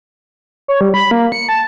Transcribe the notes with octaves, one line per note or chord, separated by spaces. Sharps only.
C#5
G3
B5
A#3
C#7
A5